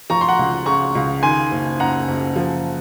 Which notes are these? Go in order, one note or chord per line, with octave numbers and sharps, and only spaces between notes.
F3 A#5 C#6
C6
F#5 A#5
C#2
C#3 A#5 C#6
C#2
D#3 G#5 C6
F#1
F#2 F#5 A#5
F#1
F3